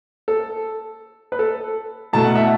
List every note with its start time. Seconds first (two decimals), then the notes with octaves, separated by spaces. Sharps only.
0.28 A4
1.32 B4
1.39 A4
2.13 B2 A3 E4 A5
2.24 F#5
2.35 E5